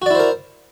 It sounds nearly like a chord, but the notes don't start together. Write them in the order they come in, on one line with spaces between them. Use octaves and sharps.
F#4 D5 E4 C5 A#4